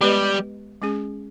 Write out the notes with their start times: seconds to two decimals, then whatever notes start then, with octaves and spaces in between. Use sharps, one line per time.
0.01 G3 G#3 B3 G4 B4 D#5
0.82 G#3 C#4 G#4